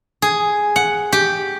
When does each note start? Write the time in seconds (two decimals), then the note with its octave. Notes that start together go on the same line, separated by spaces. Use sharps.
0.22 G#4
0.76 F#5
1.12 G4